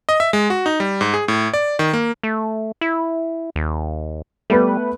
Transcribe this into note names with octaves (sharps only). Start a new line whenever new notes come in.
D#5
E5
G#3
F#4
D#4
G3
G#2
G#4
A2
D5
D#3
A#3
A3
E4
D#2
G3 A3 B3 B4